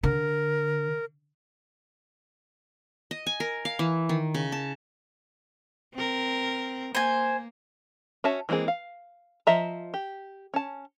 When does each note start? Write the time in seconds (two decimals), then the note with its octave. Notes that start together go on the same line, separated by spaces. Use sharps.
0.03 D3 A#4
3.11 D#5
3.27 G#5
3.40 A#4
3.65 F5
3.79 E3
4.09 D#3
4.34 C#3
4.52 A5
5.94 C4 A#4
6.95 A#3 C5 G#5
8.24 C#4 F#4 E5 A5
8.49 E3 G#3 A#3 C4 G#4
8.68 F5
9.47 F3 D#5 E5 A#5
9.94 G4
10.54 C#4 A5